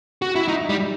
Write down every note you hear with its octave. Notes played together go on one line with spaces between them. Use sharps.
F#4
E4
D#4
G3